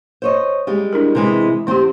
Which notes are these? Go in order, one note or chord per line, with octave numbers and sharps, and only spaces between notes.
C5 C#5 D#5
G3 G#3 G4
D4 E4 A#4
C3 E3 G#3
E2 E3 C4 G4